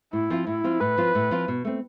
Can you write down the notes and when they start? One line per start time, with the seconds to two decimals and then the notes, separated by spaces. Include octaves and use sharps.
0.13 A2 E4
0.30 F3 C4 F4
0.47 A2 E4
0.64 F3 C4 F4
0.81 A2 B4
0.98 F3 C4 F4
1.15 A2
1.31 F3 C4 F4
1.48 B2
1.65 A3 C4